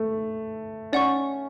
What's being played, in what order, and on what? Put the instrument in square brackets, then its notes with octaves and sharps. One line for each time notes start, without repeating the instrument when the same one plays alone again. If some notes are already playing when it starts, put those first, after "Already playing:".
Already playing: [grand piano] A3
[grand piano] C#4 [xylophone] D5 F#5 C#6